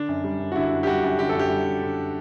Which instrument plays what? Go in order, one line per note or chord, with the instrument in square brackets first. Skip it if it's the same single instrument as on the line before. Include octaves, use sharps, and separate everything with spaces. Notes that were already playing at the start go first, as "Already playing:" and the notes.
Already playing: [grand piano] D3 D4
F#2
G3
F#2
F#4
D3 E4
F#2
G4
G3 F#4
F#2
D3 G4
A4
F#2 G4
G3
F#2
D3